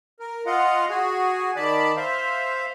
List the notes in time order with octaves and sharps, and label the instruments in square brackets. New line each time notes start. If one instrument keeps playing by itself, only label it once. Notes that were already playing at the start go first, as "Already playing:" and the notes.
[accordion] A#4
F4 D#5 F5 F#5
F#4 G#4 G#5
D#3 D5 A5 B5
C5 E5 F5